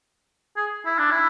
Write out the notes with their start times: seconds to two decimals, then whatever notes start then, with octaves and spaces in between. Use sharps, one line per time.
0.56 G#4
0.85 E4
0.99 D4
1.11 E4